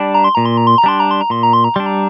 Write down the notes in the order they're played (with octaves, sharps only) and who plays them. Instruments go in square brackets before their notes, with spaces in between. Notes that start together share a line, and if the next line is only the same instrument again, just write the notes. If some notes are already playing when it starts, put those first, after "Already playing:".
Already playing: [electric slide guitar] G3 D4
[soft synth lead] A#5
C6
[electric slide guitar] A#2 [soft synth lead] A#5
[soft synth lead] C6
A#5
C6
A#5
[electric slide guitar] G3 D4 [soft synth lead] C6
[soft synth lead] A#5
C6
A#5
[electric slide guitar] A#2 [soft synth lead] C6
[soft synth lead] A#5
C6
A#5
[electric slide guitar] G3 D4 [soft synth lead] C6
[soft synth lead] A#5